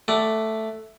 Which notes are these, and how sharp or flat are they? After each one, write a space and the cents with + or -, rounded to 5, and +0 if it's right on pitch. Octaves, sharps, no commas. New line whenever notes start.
A3 +0 D5 +0 F#5 +30